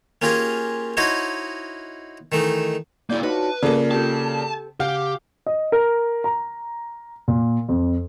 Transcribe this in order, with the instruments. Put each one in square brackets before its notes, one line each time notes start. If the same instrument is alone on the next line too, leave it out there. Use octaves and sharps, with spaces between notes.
[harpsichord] A#3 C#4 F4 G4 G#4 A#4
D#4 E4 F#4 C5 C#5 D#5
D#3 E3 A3 D#4
[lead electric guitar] A#3 E4 [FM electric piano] D5 G6
[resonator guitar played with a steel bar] D4 F4 [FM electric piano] D#4 F#4 C#5 [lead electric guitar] B4
[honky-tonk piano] C#3 A#3 [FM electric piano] F4 D5 [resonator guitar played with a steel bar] A4
[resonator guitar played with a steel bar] C4 G4 A4 [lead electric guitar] A5
[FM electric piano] C#3 [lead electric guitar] G4 [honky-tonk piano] F5 [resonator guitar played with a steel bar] F#5
[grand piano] D#5
A#4
A#5
A#2
F2